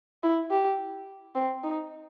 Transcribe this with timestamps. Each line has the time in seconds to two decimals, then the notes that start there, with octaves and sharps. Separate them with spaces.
0.24 E4
0.50 G4
1.35 C4
1.63 D#4